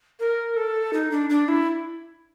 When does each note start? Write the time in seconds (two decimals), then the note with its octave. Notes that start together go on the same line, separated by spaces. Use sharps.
0.20 A#4
0.56 A4
0.93 D#4
1.11 D4
1.30 D4
1.48 E4